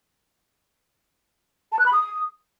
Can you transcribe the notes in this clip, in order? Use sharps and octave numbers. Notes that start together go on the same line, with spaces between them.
A5
F#6
B5
D#6